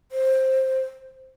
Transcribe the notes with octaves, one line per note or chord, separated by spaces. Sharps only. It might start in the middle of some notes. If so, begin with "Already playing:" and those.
C5